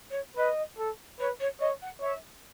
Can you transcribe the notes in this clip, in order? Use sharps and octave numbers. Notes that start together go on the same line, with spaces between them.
C#5
B4 D#5
A4
B4 C#5
C#5
C#5 D#5
F#5
C#5 E5